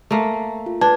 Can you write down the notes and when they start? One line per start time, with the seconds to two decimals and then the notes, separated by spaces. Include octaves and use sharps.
0.11 A3 A#3
0.66 F4
0.81 D4 B4 A5 G#6